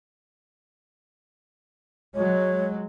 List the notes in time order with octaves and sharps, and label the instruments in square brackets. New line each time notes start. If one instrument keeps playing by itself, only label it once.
[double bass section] F#3 G#3 [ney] C#5